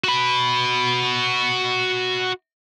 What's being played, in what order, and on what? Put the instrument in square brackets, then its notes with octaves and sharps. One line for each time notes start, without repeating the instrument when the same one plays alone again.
[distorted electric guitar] F#4 B5